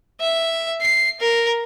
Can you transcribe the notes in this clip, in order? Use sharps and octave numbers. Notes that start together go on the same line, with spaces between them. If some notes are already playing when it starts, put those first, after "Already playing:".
E5
C7
A#4